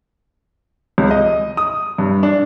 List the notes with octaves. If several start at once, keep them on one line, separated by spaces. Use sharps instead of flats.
C#2
D#5
D#6
G2
D4